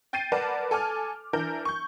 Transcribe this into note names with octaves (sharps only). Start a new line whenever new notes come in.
G5 G6 A6 C7 D#7
A#4 B4 D5 F#5 A5
A4 G#5 D6 F6
E3 D4 A#4 G6
C#6 G6